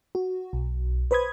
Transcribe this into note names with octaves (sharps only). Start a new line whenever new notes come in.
F#4
B1
B4 C5 B5 D#6 G#6